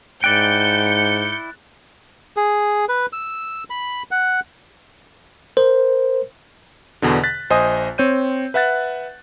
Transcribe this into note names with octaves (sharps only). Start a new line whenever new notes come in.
G#2 E4 D5 G5 F#6 G6 A6 C#7
G#4
B4
E6
B5
F#5
A#4 C5
E2 B2 D3
F#6 A6 B6
A#1 C5 D#5 G#5 D#6
C4 C#5 G6 D#7
B4 E5 F#5 F#6 A6